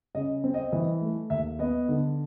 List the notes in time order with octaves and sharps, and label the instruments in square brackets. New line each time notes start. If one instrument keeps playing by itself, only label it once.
[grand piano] C#3 D#5
C4
D#5
E3 D#5
A3
D#2 E5
B3 D#5
D3